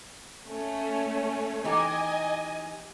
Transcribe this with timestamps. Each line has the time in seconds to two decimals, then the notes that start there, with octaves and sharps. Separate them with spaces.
0.48 A3 C#4
1.64 E3 D#4 G4 D#5 G#5